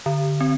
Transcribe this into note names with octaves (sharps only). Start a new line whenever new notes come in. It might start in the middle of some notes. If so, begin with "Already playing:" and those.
D3
C4